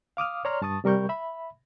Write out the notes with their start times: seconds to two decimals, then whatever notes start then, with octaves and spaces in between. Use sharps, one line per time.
0.17 F5 D6 D#6 F6
0.45 C#5 D5 A#5 C6 F6
0.62 G2 A5 C#6 D#6 A6
0.84 C3 G3 A#4 C#6 G6
1.09 E5 B5